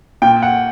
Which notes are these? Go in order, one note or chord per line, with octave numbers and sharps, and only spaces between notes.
A#2 G5
F#5